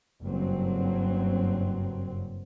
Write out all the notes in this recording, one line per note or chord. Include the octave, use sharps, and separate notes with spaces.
F#1 G2 F#3 C4